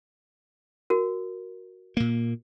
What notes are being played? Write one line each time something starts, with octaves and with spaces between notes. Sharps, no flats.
F#4 A#4
A#2 A#3